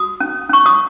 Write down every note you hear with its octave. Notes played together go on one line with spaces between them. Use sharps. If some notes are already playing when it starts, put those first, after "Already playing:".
Already playing: F#4 D#6
C#4
C#4 C#6
D#6